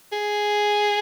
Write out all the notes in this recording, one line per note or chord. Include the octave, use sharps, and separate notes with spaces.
G#4